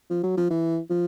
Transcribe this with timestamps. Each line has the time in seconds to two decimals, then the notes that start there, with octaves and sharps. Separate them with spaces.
0.10 F3
0.23 F#3
0.38 F3
0.50 E3
0.90 F3